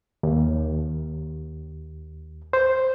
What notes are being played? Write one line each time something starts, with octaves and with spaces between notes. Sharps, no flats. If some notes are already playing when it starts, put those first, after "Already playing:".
D#2
C5